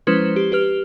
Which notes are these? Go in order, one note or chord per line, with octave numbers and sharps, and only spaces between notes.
F3 G#3 C#4 E4 B4 C5
G4
G4 B4 F6 F7